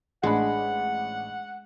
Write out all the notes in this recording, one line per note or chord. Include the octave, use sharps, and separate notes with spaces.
A1 G#3 D4 F#5 B5